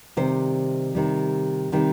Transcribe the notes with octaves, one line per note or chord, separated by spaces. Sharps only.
C3 D#3 G3 C5
C3 D#3 G3
C3 D#3 G3